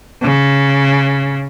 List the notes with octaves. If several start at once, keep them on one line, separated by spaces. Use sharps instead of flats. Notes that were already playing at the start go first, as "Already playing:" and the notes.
C#3